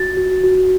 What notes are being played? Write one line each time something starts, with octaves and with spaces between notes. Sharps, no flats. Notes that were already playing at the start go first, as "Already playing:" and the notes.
Already playing: F#4 A6
F#4
F#4